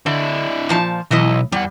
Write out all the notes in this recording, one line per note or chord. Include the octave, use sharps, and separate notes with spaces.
D3 D4 E4
A#2 F3 A5
B1 E3 E4 D#5
E2 G3 F#5